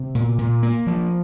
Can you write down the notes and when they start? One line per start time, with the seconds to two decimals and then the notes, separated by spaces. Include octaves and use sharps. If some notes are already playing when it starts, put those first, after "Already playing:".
Already playing: C3
0.15 A#2
0.38 A#2
0.63 A#3
0.87 F3